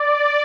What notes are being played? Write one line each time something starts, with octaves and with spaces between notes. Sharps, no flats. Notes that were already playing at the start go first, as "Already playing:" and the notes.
Already playing: D5